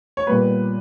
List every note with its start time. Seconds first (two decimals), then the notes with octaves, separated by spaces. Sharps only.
0.17 C#5
0.27 A#2 G3 B3 B4